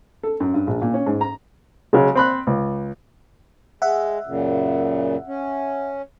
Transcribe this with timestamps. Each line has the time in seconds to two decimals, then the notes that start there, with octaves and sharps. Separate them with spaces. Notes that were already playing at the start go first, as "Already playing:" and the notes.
0.23 A4
0.40 F#2
0.54 G2
0.67 A#1
0.82 A#2
0.94 C#4
1.06 G#2
1.21 A#5
1.93 C#3 F#3 G#3
2.15 C4 B5 F#6
2.47 C#2
3.82 G#3 E5 F#5
4.27 F#2 A#2 C#3
5.27 C#4